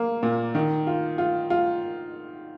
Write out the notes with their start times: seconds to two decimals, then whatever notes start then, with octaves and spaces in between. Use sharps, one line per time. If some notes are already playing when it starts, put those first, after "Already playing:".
Already playing: A#3
0.23 A#2
0.55 D#3
0.87 F4
1.18 F4
1.50 F4